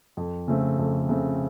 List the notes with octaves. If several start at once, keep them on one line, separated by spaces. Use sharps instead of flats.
F2
C#3 A3 C4
F2
C#3 A3 C4